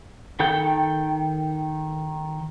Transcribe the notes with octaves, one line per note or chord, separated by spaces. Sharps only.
D#3 A4 G5 G6